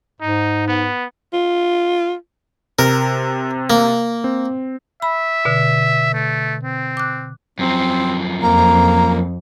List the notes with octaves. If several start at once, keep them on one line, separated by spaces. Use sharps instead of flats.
G#2 D#4
B3
F4
C3 A#4
A#3
C4
E5 B5
B2 D3
A3
C4
D6 F#6
F#2 F3 C4
F2 A#3 A#5